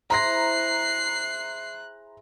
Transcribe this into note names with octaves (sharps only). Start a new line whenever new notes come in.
E4 G#4 C5 A#5 C6 F#6 A#6 C7